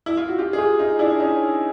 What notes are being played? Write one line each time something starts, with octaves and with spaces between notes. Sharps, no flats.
E4
F4
F#4
F4 G4
G#4
F4 G4
D#4 F4
D4 E4
C#4 D#4